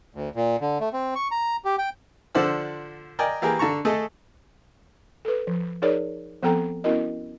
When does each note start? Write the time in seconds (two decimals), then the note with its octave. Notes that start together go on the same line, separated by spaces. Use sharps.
0.15 D2
0.36 A#2
0.61 D3
0.81 A3
0.93 C4
1.15 C#6
1.31 A#5
1.65 G4
1.78 G5
2.35 D3 F3 C5 D5 F#5 E6
3.19 A#4 D5 D#5 G5 G#5
3.42 E3 A#3 G4 G#4 A#4
3.59 D3 A5 A#5 C#6
3.85 A3 G#4 A4 D#5
5.25 A4 B4
5.47 F3
5.82 D#4 G#4 A#4 C#5 D5
6.43 F3 B3 C4 A4 G5 A#5
6.84 B3 C#4 E4 F#4 A#4 D#5